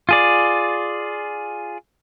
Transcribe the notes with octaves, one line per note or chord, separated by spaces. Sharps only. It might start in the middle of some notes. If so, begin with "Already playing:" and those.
F4 G#4 D5